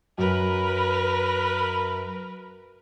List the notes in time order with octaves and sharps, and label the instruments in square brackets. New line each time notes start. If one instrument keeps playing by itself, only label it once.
[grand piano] F#2 [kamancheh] A#4 B4